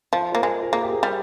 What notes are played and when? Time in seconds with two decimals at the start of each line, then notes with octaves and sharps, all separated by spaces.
0.12 F3 F4
0.32 A#3 C5
0.42 G#3 A#4
0.63 A#4
0.72 A#3 G#4
0.83 G4
0.92 G#4
1.03 G3